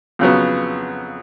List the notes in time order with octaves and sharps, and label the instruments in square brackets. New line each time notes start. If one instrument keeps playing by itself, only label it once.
[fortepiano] F2 C#3 F#3 B3